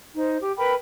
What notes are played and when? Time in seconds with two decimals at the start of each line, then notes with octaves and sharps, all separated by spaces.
0.16 D#4 C5
0.41 G4
0.57 A#4 B4 G5 B5